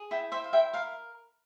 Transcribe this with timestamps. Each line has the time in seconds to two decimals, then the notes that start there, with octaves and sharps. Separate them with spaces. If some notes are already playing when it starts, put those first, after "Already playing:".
Already playing: G#4
0.11 E4 E5 G5
0.32 C5 E5 G5
0.44 F5
0.53 E4 E5 G5
0.73 A#4 F5